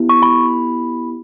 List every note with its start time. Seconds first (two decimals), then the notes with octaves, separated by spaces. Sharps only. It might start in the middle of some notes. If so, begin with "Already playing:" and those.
Already playing: B3 E4 G4
0.09 C#6
0.22 B5